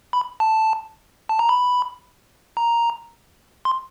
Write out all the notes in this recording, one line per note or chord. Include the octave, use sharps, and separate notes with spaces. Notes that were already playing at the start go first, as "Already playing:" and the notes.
B5
A5
A5
A#5
B5
A#5
C6